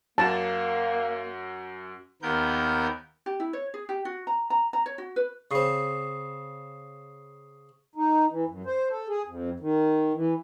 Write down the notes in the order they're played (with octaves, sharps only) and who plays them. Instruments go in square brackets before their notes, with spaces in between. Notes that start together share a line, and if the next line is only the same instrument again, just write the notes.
[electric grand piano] F#2 F#4 E7 [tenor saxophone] A#3 [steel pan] A5
[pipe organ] D#2 B3 A#4 G6
[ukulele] G4
E4
C#5
G#4
G4
F#4
A#5
A#5
A#5
C#5
F#4
B4
[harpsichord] C#3 C4 [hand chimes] C#6 D#6 C7
[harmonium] D#4
E3
F#2
C5
A4
G#4
F2
D#3
E3